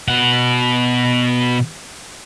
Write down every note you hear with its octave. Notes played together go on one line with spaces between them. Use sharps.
B2 F#5